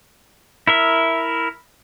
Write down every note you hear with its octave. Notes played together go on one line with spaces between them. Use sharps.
E4 A#4 E5